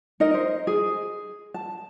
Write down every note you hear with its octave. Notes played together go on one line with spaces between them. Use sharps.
D#4 A#4 D#5
C5
G#4
A5